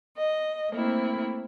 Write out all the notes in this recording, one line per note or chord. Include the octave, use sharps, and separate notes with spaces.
D#5
A3 A#3 C4 E4